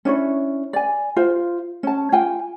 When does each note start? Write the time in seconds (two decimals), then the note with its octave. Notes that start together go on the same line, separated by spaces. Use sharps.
0.05 C#4 D4 E4 C#5
0.73 D5 G#5
1.16 F4 C5 F5
1.83 C#4 A5
2.12 F4 G5 G#5